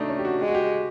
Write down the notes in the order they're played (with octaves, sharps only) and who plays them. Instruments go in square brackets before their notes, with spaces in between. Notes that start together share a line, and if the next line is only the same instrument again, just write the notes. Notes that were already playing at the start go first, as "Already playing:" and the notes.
Already playing: [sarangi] A3 [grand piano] D4 D#4 F#4
[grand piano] C#4
G4
F#4
[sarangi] G#3 [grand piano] G4
[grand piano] F#4
G4